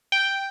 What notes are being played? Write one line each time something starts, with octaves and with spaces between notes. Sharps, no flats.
G5